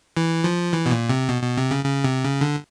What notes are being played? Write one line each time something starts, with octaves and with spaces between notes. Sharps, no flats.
E3
F3
E3
B2
A#2
C3
B2
B2
C3
C#3
C#3
C3
C#3
D3